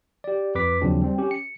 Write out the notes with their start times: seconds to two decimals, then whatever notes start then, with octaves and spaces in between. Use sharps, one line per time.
0.24 G4 D5
0.55 F2 B4 D6 B6
0.81 D#2 C#3 F3 F#3 C4 D4
1.02 G3 C4
1.18 C#4 G4
1.31 C#7